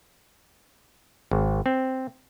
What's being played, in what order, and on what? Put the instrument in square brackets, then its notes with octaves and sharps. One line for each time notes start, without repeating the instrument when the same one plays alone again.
[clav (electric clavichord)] G#1
C4